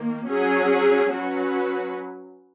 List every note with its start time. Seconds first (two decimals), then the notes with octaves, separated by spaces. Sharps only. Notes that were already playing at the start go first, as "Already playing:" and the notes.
Already playing: D#3 A#3
0.28 F#3 C#4 G#4
1.12 F#3 C#4 F#4 B4